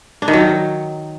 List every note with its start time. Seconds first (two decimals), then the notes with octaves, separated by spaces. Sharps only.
0.22 D4
0.28 D#3
0.33 F#3